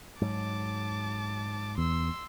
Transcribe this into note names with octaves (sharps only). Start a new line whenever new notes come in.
G#2 F#3 A5 D6
E2 C6 E6